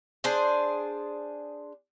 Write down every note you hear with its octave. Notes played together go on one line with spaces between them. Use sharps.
D4 G#4 C5 D5